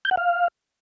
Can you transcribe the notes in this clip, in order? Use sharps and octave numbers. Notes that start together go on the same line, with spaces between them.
G6
F#5
F5